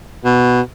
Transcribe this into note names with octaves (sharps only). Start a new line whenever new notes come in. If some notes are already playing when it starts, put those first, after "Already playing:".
B2